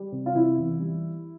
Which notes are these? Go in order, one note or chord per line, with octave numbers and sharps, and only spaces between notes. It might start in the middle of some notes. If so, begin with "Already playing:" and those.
Already playing: G3
C3
F4
C3 E4
E2
G3